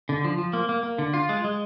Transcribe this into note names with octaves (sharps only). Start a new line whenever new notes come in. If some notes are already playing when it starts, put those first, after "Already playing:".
D3
F3
F3
A#3
A#3
A#3
D3
F4
G#3
G#3